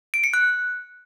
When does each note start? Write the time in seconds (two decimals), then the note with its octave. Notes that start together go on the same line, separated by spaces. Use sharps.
0.14 D7
0.24 C#7
0.34 F#6